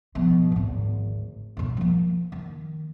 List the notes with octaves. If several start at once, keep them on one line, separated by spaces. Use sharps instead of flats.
B2 F3
G#1 D2
B2 C#4
F3 A#3
D#3